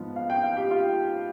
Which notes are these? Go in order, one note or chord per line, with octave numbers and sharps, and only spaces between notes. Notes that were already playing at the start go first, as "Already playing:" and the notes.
Already playing: G#2 F3 B3
F5
G5
F5
G4
F4